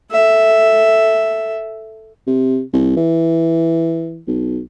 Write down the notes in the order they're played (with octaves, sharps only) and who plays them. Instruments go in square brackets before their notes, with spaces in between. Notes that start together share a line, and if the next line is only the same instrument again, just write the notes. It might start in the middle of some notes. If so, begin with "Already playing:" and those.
[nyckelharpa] A4 E5
[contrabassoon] C3
C2
E3
B1